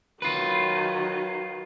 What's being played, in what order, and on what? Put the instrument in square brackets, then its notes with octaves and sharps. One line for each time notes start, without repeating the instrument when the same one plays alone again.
[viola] D#3 F#3 [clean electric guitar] F4 B4